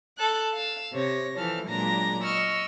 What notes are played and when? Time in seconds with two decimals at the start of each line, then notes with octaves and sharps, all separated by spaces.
0.16 A4 F#6
0.52 F5 E6
0.93 C3 C#5 A#6
1.36 E3 F3 A4 F6
1.68 A#2 F#3 G#3 D4 A#5 A#6
2.24 D#5 C#6 E6 F6